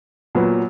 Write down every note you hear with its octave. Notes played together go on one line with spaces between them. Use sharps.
A#2 F#3 B3